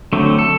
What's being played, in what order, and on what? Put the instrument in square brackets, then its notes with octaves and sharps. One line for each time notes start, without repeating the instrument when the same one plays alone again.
[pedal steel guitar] D3 F#3 A3 C4
A4